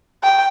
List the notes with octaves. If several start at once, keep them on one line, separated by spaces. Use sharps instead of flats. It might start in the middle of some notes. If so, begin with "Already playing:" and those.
G5